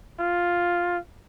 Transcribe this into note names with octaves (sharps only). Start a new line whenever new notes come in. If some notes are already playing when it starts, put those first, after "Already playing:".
F4